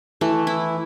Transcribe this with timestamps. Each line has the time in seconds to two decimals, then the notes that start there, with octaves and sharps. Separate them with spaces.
0.21 E3 A3
0.47 E4